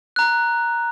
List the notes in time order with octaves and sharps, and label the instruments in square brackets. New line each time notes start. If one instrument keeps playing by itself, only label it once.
[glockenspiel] A#5 F#6